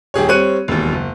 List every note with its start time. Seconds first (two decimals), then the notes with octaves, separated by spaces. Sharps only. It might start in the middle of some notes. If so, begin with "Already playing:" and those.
0.14 D#1 G4 G#4 C#5
0.28 G3 C4 C#5 F#6 C#7 D#7
0.68 E1 D#2
0.92 F#1